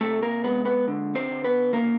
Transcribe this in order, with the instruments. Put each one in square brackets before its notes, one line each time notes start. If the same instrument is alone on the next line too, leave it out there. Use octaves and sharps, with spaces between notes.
[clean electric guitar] C3 A3 A4
A#3 A#4
G#3 B3 B4
B3 B4
D3
C4 C5
D3
B3 B4
C#3 A#3 A#4